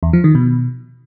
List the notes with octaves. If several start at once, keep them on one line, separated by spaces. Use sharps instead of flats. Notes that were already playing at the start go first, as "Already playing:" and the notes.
E2
F3
D#3
B2